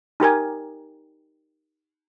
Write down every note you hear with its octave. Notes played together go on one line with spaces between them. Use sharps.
D#4 G4 A#4 G#5